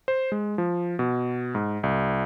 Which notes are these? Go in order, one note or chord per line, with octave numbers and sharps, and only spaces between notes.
C5
G#3
F3
B2
G#2
C2